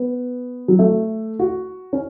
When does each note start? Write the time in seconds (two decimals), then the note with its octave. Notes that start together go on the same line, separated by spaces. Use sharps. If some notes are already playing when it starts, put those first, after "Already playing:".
Already playing: B3
0.68 F#3
0.79 A3
1.39 F#4
1.93 C#4